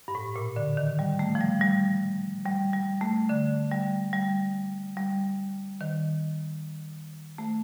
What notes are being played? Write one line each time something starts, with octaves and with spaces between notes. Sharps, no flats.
G2
A2
A#2
D3
D#3
G3
A3
F3
G3
G3
G3
G3
A3
D3
G3
G3
G3
D#3
A3